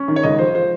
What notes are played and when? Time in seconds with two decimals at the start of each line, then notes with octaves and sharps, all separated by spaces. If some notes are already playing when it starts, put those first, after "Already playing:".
Already playing: C#4
0.08 D#3
0.16 C#5
0.23 C#2 D#5
0.39 F3 C5
0.55 F3 C5